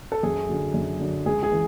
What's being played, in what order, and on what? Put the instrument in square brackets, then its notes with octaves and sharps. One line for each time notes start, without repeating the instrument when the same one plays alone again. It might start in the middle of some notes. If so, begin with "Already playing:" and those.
[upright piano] A4
F#2 G#4
D3 F#3
F#2
D3 F#3
C#2 G#4
G#4
E3